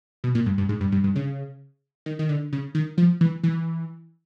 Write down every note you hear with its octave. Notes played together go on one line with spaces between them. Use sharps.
B2
A#2
G2
G2
G#2
G2
G2
G2
C#3
D#3
D#3
D3
C#3
D#3
F3
E3
E3